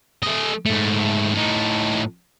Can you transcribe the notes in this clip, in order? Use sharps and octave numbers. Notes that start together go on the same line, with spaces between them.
A3 D#5
G#2 A3
A2 D#4